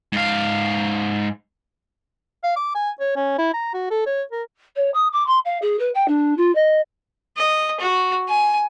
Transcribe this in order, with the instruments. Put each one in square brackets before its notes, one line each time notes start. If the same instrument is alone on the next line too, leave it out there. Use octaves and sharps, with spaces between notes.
[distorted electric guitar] G#2 F5
[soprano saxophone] F5
D6
G#5
C#5
C#4
E4
A#5
F#4
A4
C#5
A#4
[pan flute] C#5
D#6
D6
C6
F5
G#4
B4
G5
D4
F4
D#5
[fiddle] D#5
F#4
G#5